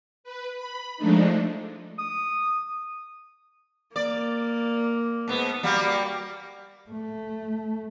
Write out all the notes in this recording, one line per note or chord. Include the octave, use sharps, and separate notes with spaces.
B4
B5
F3 G#3 A3 D4 D#4
D#6
A#3 D5
G#2 B3
G3 A#3 F#4
A3